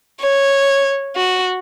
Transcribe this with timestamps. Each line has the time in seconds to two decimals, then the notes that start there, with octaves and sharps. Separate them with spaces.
0.21 C#5
1.17 F#4